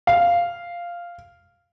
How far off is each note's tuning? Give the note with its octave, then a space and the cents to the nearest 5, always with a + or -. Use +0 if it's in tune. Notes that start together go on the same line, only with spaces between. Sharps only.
F5 -5